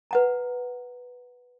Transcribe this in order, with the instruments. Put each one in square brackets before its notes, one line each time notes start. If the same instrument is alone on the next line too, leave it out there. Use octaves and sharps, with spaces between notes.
[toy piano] B4 F#5 A#5